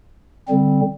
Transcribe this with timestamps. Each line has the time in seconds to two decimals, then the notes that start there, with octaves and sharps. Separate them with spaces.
0.48 D3 G3 C4